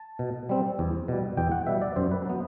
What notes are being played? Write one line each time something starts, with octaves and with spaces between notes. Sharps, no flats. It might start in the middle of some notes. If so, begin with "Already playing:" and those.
Already playing: A5
B2
G3 C4
E2
B2 G3
E2 G5
F#5
B2 G3 E5
D5
F#2 C5
B4
F#3 B3